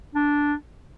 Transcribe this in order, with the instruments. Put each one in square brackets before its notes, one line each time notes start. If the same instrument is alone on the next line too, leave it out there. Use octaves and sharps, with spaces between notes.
[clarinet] D4